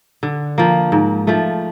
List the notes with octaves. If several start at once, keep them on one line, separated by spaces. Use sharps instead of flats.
D3
F3 A#3
G#2
F3 A3